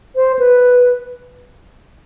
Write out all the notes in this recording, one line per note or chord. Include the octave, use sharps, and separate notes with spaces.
C5
B4